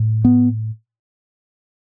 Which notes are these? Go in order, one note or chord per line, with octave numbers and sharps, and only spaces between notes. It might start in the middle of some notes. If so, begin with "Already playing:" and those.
Already playing: A2
B3